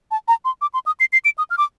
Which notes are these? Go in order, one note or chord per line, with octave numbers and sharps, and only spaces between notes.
A5
A#5
C6
D6
C6
D#6
C7
C7
D7
D#6
F6
D6